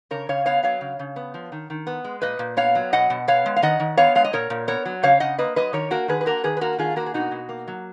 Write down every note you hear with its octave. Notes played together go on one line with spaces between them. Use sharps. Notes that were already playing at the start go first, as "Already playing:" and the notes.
C#3 A#4 C#5
C#3 C#5 F5
B3 C#5 F5
F#3 C#5 F5
C#3
C#3
B3
F3
D#3
D#3
B3
G#3
A#2 B4 D#5
A#2
B3 C#5 F5
F#3
B2 D#5 F#5
B2
B3 C#5 F5
G#3
F5
D#3 D#5 F#5
D#3
B3 C#5 F5
G#3 F5
D#5
A#2 A#4 C#5
A#2
B3 A#4 C#5
F#3
C#3 C#5 F5
C#3 D#5 F#5
A#3 B4 D#5
F#3 B4 D#5
D#3 A#4 C#5
A#3 F#4 A#4
D#3 G#4 B4
B4
A#3 F#4 A#4
D#3 G#4 B4
B4
A#3 F#4 A#4
D#3 F4 G#4
A#3 F#4 A#4
G#4
B2 D#4 F#4
B2
A#3
F#3